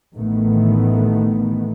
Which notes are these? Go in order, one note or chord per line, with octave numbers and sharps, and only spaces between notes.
A1 D#3 A3 B3